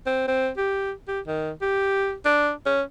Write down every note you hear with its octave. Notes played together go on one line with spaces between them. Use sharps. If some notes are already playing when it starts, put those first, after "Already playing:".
C4
C4
G4
G4
D#3
G4
D4
C#4